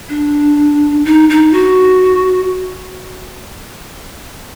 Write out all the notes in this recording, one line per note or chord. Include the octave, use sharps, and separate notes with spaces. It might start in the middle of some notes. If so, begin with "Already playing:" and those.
D4
D#4
D#4
F#4